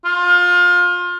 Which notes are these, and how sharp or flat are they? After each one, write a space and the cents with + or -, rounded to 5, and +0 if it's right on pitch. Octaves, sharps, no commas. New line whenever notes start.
F4 +25